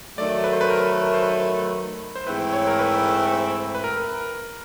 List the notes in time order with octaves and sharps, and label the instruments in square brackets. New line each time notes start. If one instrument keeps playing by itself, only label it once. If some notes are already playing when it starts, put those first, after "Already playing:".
[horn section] D#3 F#3 A3 [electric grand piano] D5
[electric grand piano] B4
C5
B4
A#4
C5
B4
C5
[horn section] G#2 E3 A3 C4 E4 [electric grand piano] B4
[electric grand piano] C#5
A#4
B4
B4
A#4